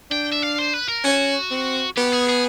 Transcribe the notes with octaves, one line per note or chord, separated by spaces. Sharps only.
D4 G5
E5
F5
C5
B4
A#4
C#4 F#4
C4
B3 G4
G#4
G#4